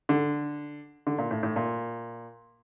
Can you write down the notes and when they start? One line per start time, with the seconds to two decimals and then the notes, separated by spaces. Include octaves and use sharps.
0.09 D3
1.07 D3
1.18 A#2
1.31 A2
1.43 A2
1.56 A#2